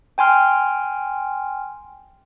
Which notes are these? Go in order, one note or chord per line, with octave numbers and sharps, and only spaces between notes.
G5 G#5 C6 F6